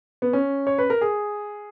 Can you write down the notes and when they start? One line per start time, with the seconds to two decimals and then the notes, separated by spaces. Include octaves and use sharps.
0.22 B3
0.33 C#4
0.67 C#5
0.78 B4
0.90 A#4
1.01 G#4